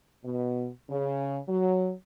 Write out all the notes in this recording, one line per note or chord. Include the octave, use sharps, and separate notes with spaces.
B2
C#3
F#3